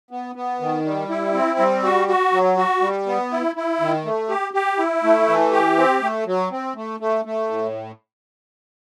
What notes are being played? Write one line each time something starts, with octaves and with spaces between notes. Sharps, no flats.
B3
B3
D#3
G3
E4
C4
G3
F#4
F#4
F#3
F#4
G3
B3
E4
E4
D#3
A3
G4
G4
E4
A3
E3
G4
C4
A3
F#3
C4
A3
A3
A3
A2